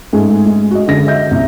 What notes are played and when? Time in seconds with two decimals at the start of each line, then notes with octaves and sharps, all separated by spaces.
0.13 G#2 G#3 A3
0.45 G#3
0.71 F#4 D#5
0.88 D3 G#4 A#6
1.07 D#5 E5 G6
1.31 C2